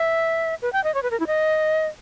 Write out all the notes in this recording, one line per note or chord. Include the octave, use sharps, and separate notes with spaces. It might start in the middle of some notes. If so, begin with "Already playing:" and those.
Already playing: E5
B4
G5
D#5
C#5
B4
A#4
E4
D#5